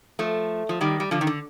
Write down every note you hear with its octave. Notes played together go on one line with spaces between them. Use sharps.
F3 A3
F3
D#3 G3
G3
D3 F3
D#3
D3